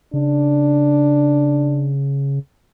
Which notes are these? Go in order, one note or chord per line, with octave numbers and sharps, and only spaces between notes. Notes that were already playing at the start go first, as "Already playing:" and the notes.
C#3 D4